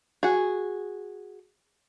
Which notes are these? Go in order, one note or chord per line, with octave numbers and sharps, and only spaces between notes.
F#4 G#4